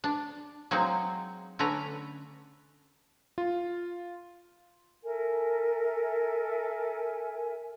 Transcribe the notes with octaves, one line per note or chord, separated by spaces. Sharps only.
D4
F#3 G#3 A#3 C4 D#4
D3 A3 C#4 B4 A#5
F4
A4 A#4 E5 G#5